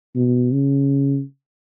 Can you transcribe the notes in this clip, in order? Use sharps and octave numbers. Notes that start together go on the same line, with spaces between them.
B2
C#3